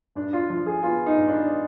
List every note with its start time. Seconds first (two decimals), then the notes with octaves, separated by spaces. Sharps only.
0.15 G2 D4
0.33 F4
0.50 F3 F4
0.66 G#4
0.83 B3 F4
1.06 D#4
1.17 G2
1.28 D4